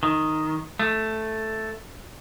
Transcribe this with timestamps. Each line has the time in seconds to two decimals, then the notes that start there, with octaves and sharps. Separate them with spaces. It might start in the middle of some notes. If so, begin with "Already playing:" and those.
0.03 D#3
0.79 A3